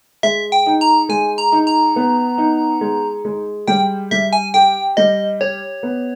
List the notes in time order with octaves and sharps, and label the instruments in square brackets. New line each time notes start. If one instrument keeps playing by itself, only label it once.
[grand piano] G#3 [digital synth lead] E5
[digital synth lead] G5
[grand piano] D#4
[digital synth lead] A#5
[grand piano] G#3 [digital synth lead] G#5
[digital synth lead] A#5
[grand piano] D#4
[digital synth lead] A#5
[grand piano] B3
D#4
G#3
G#3
[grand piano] G3 [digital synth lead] G5
[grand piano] G3 [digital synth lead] E5
[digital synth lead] G#5
[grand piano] G4 [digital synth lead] G5
[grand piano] G3 [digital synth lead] D#5
[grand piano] G4 [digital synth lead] C#5
[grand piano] B3